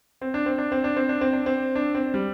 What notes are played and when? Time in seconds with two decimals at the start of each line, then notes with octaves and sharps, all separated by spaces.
0.22 C4
0.34 D4
0.46 C4
0.58 D4
0.72 C4
0.84 D4
0.96 C4
1.09 D4
1.21 C4
1.33 D4
1.46 C4
1.76 D4
1.95 C4
2.14 G3